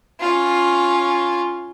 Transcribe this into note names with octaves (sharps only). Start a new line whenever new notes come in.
C#4 F4